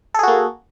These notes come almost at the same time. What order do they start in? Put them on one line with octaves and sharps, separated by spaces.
A4 G#4 F#4 A#3